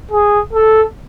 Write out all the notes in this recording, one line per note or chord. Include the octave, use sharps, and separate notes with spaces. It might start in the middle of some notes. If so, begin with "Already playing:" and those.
G#4
A4